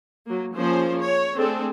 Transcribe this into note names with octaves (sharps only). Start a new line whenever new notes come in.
F#3 A#3
F3 A#3 C#4 G#4 C5
C#5
A3 C4 D4 G#4 A4